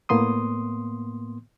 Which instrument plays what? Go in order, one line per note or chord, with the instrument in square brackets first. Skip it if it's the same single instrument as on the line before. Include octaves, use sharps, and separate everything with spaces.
[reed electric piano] A2 A#3 B3 C6 D#6